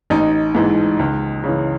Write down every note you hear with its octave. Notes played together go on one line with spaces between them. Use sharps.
A1 D#4
G#2 E3
C#2
C#3 E3